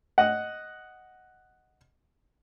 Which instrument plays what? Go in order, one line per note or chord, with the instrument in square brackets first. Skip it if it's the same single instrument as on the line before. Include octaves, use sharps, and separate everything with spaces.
[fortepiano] D#5 F#5